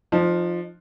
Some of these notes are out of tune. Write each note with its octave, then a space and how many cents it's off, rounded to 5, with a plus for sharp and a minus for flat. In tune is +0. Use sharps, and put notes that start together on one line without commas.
F3 +0 D#4 -35